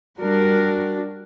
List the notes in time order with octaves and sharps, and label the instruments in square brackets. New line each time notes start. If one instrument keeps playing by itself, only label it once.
[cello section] G3 A#4 [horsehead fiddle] D4 F#4